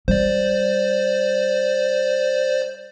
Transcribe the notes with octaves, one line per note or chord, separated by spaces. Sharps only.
G3 C5 D5